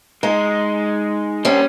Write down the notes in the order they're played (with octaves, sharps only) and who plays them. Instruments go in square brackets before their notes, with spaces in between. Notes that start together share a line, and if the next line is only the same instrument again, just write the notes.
[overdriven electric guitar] G#3 [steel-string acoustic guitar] D#4
[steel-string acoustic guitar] G3 C#4 [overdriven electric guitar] A#3 C5